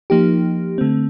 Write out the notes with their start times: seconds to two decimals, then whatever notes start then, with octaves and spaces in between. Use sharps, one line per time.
0.10 F3 A#3 D#4 G4
0.78 D3 A3 C4